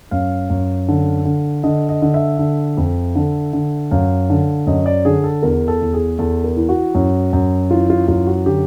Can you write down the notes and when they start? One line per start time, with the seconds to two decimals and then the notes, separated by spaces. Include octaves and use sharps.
0.11 F#2 F5
0.50 F#2
0.88 D3
1.25 D3
1.63 D3 D#5
1.89 D#5
2.02 D3
2.14 E5
2.39 D3
2.77 F2
3.15 D3
3.53 D3
3.91 F#2 F5
4.30 D3
4.67 F#2 D#5
4.86 D5
5.05 D3 G#4
5.24 A4
5.43 E2 A#4
5.68 A4
5.81 E2
5.93 G#4
6.19 E2 A4
6.44 A#4
6.57 E3
6.69 F#4
6.95 F#2
7.33 F#2
7.71 E3 F4
7.90 F4
8.08 F#2 F4
8.27 F#4
8.46 D3 G4